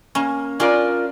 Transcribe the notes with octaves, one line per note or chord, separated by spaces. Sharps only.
A#3 C#4
C#4 D4 F4 A#4 D5